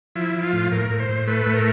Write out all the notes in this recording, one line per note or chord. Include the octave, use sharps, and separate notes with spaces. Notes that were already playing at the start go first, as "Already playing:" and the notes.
F3 E4
F3
F4
A2
A2 A#4
A2
C5
A2
A3 B4
A2
A#4